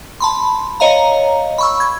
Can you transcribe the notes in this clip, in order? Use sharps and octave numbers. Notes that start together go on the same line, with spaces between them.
A5 B5 C6
C#5 D#5 F5 A#5
B5 C#6 E6
G#6